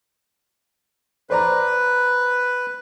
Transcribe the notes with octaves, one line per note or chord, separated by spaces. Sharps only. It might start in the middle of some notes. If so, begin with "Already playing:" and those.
B4 C5 D5 A#5